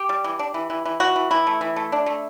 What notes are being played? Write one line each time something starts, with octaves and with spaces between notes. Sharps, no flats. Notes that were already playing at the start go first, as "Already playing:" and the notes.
Already playing: G4
G3
E3
D4
E3
E3
E3
E3 F#4
E3
E3 E4
A3
E3
A3
D4
A3